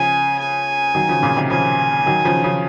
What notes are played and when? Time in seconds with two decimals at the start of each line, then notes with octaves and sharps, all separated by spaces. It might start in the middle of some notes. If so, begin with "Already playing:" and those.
Already playing: C#3 F3 G#5
0.39 G#5
0.95 D#3 F#3
1.09 C#3 F3
1.23 A#2 C#3
1.37 C3 D#3
1.50 C#3 F3 G#5
2.06 D#3 F#3
2.25 C#3 F3
2.44 C#3 F3